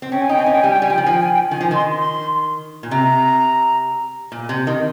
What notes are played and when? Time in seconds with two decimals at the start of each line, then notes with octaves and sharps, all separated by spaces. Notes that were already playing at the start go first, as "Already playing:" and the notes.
0.02 C4
0.11 C#4 G5
0.21 G#5
0.29 D#4 G5
0.38 C4
0.42 C#4 G#5
0.52 G5
0.62 G3 G#5
0.72 G5
0.82 G3 G#5
0.90 F3 G5
0.98 D#3
1.03 F3 G#5
1.13 G5
1.22 G#5
1.33 G5
1.51 D#3 G#5
1.61 F3
1.71 D#3 C6
1.98 C6
2.83 A#2
2.91 C3 A#5
4.32 A#2
4.49 C3
4.67 D#3